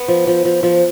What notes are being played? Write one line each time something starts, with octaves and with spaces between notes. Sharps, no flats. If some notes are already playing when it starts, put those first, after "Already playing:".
Already playing: B3
F3
F3
F3
F3